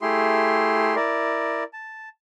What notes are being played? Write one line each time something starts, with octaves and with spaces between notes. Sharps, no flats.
A3 E4 G4 G#4 C6
E4 A#4 D5
A5